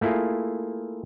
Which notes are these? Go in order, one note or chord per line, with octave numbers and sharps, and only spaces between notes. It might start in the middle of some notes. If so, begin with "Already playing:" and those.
A3 A#3 E4 F4 G#4